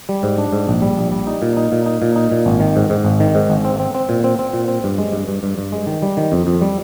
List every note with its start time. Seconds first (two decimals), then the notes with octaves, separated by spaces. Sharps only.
0.09 G3
0.23 G#2
0.38 D4
0.53 G#2
0.67 A#1
0.82 G3
0.97 A#1
1.12 G3
1.27 D#4
1.42 A#2
1.57 D#4
1.72 A#2
1.86 D#4
2.02 A#2
2.16 D#4
2.31 A#2
2.46 G#1
2.60 D#3
2.76 G#2
2.90 G#2
3.05 G#1
3.20 D#3
3.35 G#2
3.50 G#1
3.65 C4
3.80 C4
3.94 C4
4.09 A#2
4.24 C4
4.39 C4
4.53 A#2
4.68 C4
4.84 G2
4.98 G#3
5.13 G2
5.28 G2
5.43 G2
5.58 G2
5.72 G#3
5.87 D#3
6.02 G3
6.17 D#3
6.32 F2
6.47 F2
6.61 G3